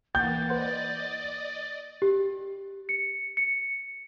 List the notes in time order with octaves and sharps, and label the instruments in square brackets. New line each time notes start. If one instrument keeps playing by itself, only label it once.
[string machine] E3 A#3 [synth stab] F#5 G5 [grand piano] G6 [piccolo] A6
[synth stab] B4 C5 F#5 [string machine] D5 D#5
[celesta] G4
C#7
C#7